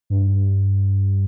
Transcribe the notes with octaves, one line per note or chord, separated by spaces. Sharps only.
G2